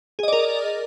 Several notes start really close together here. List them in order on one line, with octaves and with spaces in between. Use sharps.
G#4 D#5 D5 A#4